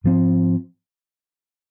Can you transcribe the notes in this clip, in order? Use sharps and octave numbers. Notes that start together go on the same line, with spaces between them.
G#2 F3 C4